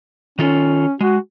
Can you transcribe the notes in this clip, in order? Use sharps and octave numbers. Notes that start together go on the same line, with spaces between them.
D#3 C#4 F4 A4
G#3 F#4